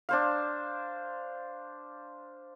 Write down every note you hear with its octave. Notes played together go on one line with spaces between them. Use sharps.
D4 C5 F5